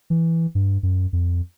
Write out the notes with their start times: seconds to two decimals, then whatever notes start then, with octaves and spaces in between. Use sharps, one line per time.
0.10 E3
0.55 G2
0.83 F#2
1.13 F2